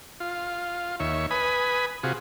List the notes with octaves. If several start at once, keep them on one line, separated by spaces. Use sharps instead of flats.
F4
D#2 C#5 E5
B4 G#5 B5 D#6
C3 F4 F#4 G#4